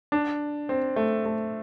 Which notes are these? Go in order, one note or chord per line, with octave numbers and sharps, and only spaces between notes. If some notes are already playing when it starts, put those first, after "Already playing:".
D4
C4
A3
A3